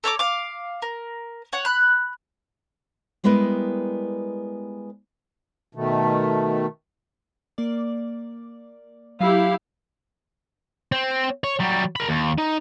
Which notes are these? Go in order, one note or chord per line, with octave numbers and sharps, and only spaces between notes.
A4 C#5 A#5 D6
F5 D6
A#4
C#5 F#5
B5 F#6
G3 G#3 B3 E4 A#4 B4
B2 D#3 A3
A#3 D5
F#3 E4 G4 F5
C4
C#5
F#3 G3
A#4 B5
D#2
D#4